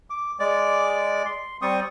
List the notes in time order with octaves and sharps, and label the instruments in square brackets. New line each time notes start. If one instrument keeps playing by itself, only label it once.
[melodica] D6
G#3 D5 D6
C6
G3 C4 C#6 D#6